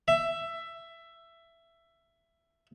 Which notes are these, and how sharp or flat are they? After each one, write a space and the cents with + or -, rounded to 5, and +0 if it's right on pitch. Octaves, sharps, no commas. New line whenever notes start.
E5 +15